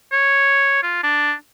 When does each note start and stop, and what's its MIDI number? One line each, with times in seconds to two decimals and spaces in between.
0.12 0.81 73
0.83 1.00 65
1.03 1.33 62